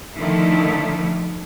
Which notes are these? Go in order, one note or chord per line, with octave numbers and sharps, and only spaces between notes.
D3 D#3 F3 A3 E4